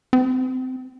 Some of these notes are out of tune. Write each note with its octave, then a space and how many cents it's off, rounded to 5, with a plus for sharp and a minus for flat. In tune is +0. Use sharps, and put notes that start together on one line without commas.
C4 -25